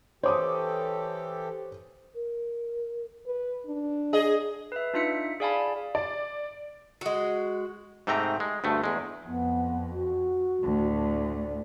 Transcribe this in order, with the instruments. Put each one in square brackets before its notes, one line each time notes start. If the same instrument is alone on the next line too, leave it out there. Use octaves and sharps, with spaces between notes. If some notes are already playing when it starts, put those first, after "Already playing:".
[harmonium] E3 G4 A4 [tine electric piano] C5 [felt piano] C#5 D6 D#6
[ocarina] A#4
[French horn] B4
D4
[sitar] G#4 D#5
[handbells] B4 E5
D4 D#4 F4 E5 B6 C#7
G#4 D5 F5 G#5 A5 B5
[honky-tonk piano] D5
[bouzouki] G#3 F#4
[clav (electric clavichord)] G#2 C3 A3 C4 G5 A#5
G#3
D2 G2 A3
E2 G#3
[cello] F2 [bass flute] B3
[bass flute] F#4
[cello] D2 A2
[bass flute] D5